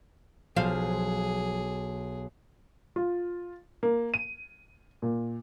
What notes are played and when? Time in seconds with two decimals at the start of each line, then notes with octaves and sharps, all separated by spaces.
0.56 B1 F3 G#4 C5 F5
2.96 F4
3.83 A#3
4.14 D#7
5.02 A#2